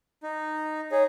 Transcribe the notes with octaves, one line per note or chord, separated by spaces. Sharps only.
D#4
D#4 G#4 C#5